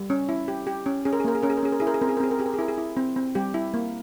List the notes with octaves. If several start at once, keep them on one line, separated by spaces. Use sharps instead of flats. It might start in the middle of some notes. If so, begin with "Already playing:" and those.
Already playing: G3
C#4
E4
G4
G4
C#4
C#4 G#4
A#4
G#4
A#3 A#4
G#4
C#4 A#4
G#4
A#4
C#4 G#4
A#4
E4 G#4
A#4
G#4
C4 A#4
G#4
A#4
C4 G#4
A#4
G4 G#4
A#4
G#4
E4 A#4
G#4
E4
C4
C4
G3 G4
E4
A#3